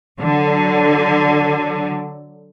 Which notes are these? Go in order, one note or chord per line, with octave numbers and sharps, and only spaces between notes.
D3 F#3